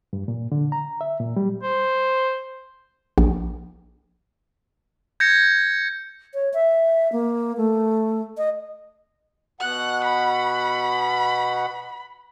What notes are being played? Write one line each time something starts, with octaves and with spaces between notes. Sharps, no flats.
G2
A#2
D3
A#5
E5
A#2
G3
C5
A#1
G6 G#6 A#6 C#7
C#5
E5
A#3
A3
D#5
B2 F#5 F#6
B5